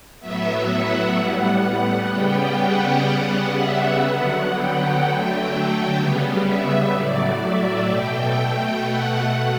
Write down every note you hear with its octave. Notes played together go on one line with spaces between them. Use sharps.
A2 F#3 B3 E5
F#5
A2 G3 B3
F#5
C#3 G3 B3 G5
F#5
C#3 G3 B3
E5
D3 F#3 B3 F#5
G5
D3 F#3 A3
C#3 G3 B3
E5
A2 F#3 A3 D5
E5
B2 A3 G5
B2 A3 F#5